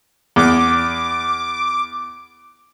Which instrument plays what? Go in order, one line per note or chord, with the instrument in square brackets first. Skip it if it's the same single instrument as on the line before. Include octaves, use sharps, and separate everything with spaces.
[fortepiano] E2 [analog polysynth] D6